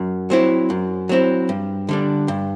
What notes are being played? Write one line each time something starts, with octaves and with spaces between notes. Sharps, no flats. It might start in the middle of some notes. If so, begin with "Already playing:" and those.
Already playing: F#2
F#3 C4 E4
F#2
F#3 C4 E4
G2
D3 G3 D4
G2